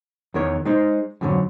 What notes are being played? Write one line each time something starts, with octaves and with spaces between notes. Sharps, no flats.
E2 D#3 E3 A#4 C#5
G#3 D#4 C5
F2 G#2 D3 E3 F#3